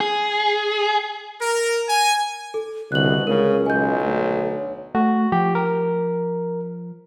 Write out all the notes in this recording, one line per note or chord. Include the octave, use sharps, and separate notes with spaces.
G#4
A#4
G#5
A4
C2 B2 D3 F#6 F#7
C#2 C#3 G#3 A#4
B1 D#5 G#5 G6
D2 C#5
A3 F#4
F3 G4
A#4